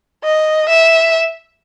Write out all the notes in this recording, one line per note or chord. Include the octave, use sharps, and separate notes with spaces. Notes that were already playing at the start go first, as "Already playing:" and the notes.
D#5
E5